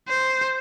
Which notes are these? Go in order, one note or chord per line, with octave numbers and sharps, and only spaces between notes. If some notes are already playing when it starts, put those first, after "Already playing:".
C5